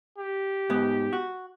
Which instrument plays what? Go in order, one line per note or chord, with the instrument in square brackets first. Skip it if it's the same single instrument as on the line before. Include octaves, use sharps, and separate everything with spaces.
[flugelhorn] G4
[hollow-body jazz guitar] G#2 B3
F#4